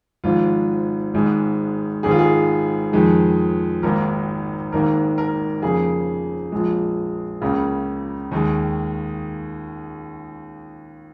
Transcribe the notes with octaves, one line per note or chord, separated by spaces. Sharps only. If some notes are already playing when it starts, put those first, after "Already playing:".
G#1 G#2 F3 F4
G#1 G#2 G#3
G#1 G#2 D#3 G#4
F4
G#4
F2 D#3 G#3
G#1 G#2 D#3 A#3 A#4
G#1 G#2 D#3 A#3 A#4
A#4
F2 C#3 A#3 G#4
A#1 A#2 G#3
C#2 C#3 A#3
D#2 D#3 G#3